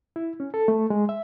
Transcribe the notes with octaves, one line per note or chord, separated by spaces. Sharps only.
E4
C#4
A4
A3
G#3
E5